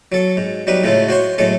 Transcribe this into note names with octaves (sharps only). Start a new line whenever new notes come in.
F#3 A4
G#2
F#3 G3 D#4 B4
A2 C#3 G#3 A3 F4
F#4 C5 C#5 C6
A2 F#3 G#3 A4